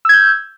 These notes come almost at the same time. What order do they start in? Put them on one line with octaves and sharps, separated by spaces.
E6 G#6 G6